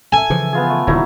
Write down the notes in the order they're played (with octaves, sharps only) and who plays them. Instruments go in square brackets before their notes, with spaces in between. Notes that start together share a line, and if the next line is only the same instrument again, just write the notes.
[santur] A4 E5 [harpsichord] G#5
[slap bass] C#3 E3 F3
[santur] B3 F4 G#4
A3
[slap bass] D#1 D3 [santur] F#3 D#4 E4